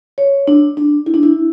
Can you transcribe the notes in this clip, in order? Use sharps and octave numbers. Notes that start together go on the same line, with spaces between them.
C#5
D4
D4
E4
D4
E4